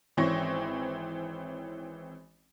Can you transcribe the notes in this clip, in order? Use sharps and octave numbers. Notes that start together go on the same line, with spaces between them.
G#1 E3 C4 C#4 C#6 A#6